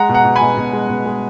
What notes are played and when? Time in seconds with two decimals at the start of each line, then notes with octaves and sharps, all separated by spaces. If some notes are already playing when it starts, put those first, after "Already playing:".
Already playing: G#3 F#5 A#5
0.09 B2
0.14 F#5 A#5
0.25 B2
0.36 G#5 B5
0.42 B2
0.57 B2
0.73 G#3
0.90 B2
1.06 G#3